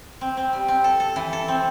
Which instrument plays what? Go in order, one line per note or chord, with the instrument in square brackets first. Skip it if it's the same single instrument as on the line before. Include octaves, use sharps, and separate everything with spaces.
[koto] C4
C4
G3
C4
A4
A4
E3
A4
C4